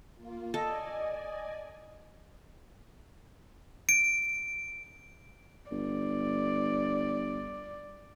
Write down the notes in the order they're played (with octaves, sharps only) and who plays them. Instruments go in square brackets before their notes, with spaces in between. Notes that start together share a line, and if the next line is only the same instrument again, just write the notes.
[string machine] A#3 F4
[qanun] A4 [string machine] D5 G#5 [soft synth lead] D#5
[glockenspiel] D7
[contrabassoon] G1 [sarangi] D5